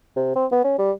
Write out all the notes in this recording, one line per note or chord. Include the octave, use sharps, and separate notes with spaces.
C3
C4
B3
C#4
G3